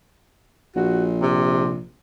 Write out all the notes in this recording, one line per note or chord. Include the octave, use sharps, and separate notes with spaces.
A#1 F#4
C3